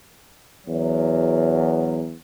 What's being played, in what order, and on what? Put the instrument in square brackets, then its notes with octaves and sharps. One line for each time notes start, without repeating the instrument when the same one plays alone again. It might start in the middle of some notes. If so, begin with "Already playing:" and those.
[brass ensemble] E2 F#3